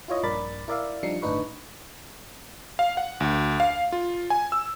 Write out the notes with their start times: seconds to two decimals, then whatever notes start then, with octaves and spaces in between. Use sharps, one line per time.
0.08 E4 F4 C#5 D#5
0.23 A#1 G2 A#4 D5 B5 A6
0.68 E4 A#4 D5 E5 F5
1.03 F3 G3 D4 D#4 C7 C#7
1.22 G1 A2 D4 D#4 B4 C#6
2.79 F5
2.97 F#5
3.20 D2
3.60 F5
3.92 F4
4.30 G#5
4.52 E6